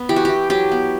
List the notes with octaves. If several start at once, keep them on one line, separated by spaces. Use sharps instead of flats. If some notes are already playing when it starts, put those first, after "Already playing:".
Already playing: B3
E3 G4
F#4
E3 G4
F#3 G4
B3